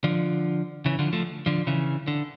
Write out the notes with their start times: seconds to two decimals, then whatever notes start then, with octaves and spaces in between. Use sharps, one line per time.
0.04 D3 F3
0.86 C#3 E3
0.99 D3 F3
1.13 F3 A3
1.46 D3 F3
1.67 C#3 E3
2.08 D3